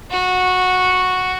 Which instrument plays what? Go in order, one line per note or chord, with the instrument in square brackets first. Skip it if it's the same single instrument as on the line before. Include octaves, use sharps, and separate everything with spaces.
[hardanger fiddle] F#4